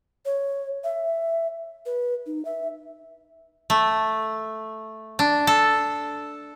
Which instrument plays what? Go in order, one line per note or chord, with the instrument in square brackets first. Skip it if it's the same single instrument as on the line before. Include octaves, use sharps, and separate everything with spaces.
[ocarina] C#5
E5
B4
D#4
E5
[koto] A3
D4
A4